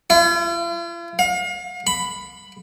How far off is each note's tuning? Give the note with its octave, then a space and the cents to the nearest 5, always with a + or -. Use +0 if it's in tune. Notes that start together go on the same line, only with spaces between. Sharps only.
F4 -45
F5 +40
B5 +10